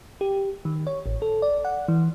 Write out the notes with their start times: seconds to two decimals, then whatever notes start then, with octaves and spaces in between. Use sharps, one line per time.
0.21 G4
0.65 D#3
0.87 C#5
1.06 A1
1.22 A4
1.42 D5
1.65 F#5
1.88 E3